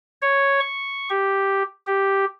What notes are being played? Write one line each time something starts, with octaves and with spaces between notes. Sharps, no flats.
C#5
C#6
G4
G4